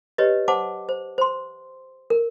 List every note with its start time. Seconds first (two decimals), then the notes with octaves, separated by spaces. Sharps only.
0.18 G4 B4 C#5 D#5
0.48 C5 F#5 A5 D6
0.89 C5
1.18 C5 C6
2.10 A#4